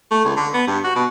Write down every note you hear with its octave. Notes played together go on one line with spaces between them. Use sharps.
A3
C#2
D3
B3
G2
F#4
B2